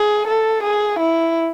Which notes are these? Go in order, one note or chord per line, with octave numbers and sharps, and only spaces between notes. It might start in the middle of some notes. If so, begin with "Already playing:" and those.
Already playing: G#4
A4
G#4
E4